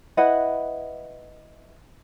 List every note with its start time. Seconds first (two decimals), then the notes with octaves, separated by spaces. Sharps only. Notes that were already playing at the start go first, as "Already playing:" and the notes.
0.17 E4 B4 D#5 F#5